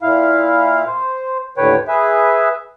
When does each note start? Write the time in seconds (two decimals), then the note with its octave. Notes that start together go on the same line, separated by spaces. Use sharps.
0.02 A#2 E4 F5
0.87 C5
1.57 D#2 A2 D3 B4 C#5 G5
1.88 G#4 B4 E5